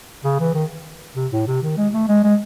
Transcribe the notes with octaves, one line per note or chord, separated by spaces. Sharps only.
C#3
E3
D#3
C3
A2
C3
D#3
G#3
A3
G#3
G#3